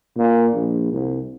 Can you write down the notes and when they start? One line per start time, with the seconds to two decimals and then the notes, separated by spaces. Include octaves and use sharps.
0.17 A#2
0.53 A#1
0.92 C2